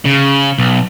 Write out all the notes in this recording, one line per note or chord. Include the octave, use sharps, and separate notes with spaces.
C#3
B1